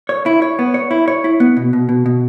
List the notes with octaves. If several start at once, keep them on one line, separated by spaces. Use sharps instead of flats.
C#5
E4
C#5
B3
C#5
E4
C#5
E4
B3
B2
B2
B2
B2